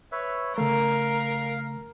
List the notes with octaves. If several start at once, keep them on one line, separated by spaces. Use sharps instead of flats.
B4 C#5 E5
C#3 A3 A#4 F5